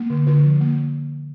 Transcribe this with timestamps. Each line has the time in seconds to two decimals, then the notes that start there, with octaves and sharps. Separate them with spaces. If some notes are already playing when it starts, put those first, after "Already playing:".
Already playing: A#3
0.10 D3
0.27 D3 F4
0.44 F3
0.60 A#3